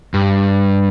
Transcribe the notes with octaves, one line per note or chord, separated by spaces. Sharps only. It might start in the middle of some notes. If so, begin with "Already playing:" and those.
G2